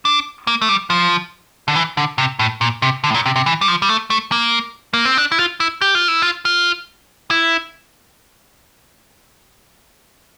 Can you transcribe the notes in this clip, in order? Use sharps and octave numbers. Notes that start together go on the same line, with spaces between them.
D4
A#3
A3
G3
F3
D3
E3
D3
C3
A2
A#2
C3
D3
A2
A#2
C3
C3
E3
G3
F3
G3
A3
A3
A#3
A#3
C4
D4
E4
F4
E4
G4
F4
E4
F4
F4
E4